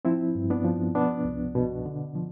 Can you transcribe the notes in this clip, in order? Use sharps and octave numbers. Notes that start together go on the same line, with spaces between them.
F3 C4 E4
G2
B3 D4
F3
B2 B3 D4
C2
B2
D3
F3